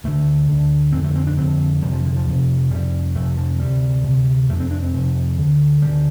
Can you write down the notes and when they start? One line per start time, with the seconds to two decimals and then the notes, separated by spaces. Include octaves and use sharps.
0.04 D2 D3 A3
0.48 D2 D3
0.92 F2 D3 C4
1.04 A3
1.15 C4
1.27 D4
1.37 F2 D3 C4
1.82 F2 C3 G3
1.93 F3
2.05 D3
2.16 F3
2.27 F2 C3
2.71 F2 C3 G3
3.15 F2 C3 A3
3.37 F3
3.59 D2 C3 G3
4.04 D2 C3
4.49 F2 C3 A3
4.60 C4
4.71 D4
4.82 C4
4.93 F2 C3
5.38 D2 D3
5.82 D2 D3 G3